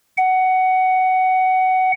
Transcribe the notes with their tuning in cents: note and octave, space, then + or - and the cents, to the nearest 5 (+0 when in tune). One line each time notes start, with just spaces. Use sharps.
F#5 +15